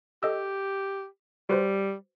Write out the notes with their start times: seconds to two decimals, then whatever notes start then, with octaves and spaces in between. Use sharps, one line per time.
0.23 G4 A4 D#5 E6
1.49 G3 F#4 B4 C5